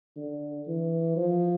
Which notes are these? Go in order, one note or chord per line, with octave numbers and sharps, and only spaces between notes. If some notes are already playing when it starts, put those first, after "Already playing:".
D3
E3
F3